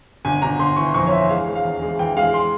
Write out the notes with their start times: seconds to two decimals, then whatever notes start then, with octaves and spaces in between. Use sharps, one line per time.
0.25 G1 G#5
0.42 G1 A#5
0.59 G1 C6
0.76 E3 C#6
0.94 F2 C#6
1.06 C#5
1.12 E3 E5
1.30 G#3 F5
1.47 G#3
1.55 F5
1.64 E2
1.82 G#3
1.99 E3 G5
2.17 G#3 F5
2.34 C6